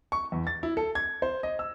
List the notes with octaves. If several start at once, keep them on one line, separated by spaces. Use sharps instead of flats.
C#6
E2
A6
E4
A4
G#6
C5
D#5
E6